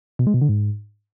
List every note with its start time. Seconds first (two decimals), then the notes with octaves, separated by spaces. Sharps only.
0.19 B2
0.27 G#3
0.34 B2
0.42 D3
0.49 G#2